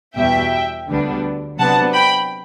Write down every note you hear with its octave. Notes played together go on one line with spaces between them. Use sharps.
E2 B2 G3 E5 G5
D2 D3 G3 B3 D4
C3 F#3 B3 D4 F#5 A5
G5 B5